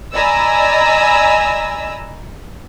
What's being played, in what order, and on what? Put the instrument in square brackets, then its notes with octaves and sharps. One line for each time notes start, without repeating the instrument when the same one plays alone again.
[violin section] D5 D#5 G#5 A#5 B5 E6